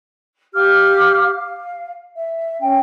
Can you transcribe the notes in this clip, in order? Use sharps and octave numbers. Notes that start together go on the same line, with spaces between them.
G4 F5 D6 F6
F5
E5
C#4 G5